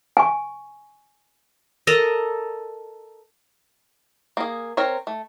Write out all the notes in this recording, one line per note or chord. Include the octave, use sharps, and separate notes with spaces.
G#5 C#6
A4 A#4 D#5
A#3 G#4
C4 A#4 C#5
A3